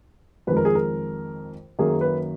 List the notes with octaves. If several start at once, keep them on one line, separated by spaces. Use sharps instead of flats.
F2 D#3 G#3 B4
A#4
G#4
A#4
F#2 D#3 A#3 G#4
B4